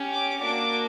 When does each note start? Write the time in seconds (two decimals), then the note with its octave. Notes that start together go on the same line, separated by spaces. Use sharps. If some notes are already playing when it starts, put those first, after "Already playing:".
Already playing: C#4 G4
0.12 D6
0.41 A#3 D4 F#4 D6